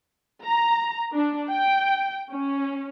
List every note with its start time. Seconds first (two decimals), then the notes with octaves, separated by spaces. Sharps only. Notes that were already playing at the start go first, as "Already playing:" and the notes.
0.44 A#5
1.16 D4
1.50 G5
2.32 C#4